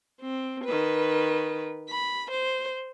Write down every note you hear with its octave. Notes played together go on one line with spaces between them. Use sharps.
C4
D#3 B4
B5
C5